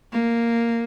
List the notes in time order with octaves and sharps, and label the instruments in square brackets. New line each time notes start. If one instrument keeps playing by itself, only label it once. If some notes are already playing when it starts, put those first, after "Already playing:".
[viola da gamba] A#3